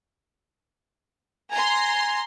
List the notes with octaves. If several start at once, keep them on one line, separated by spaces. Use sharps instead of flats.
G#5 A#5 C6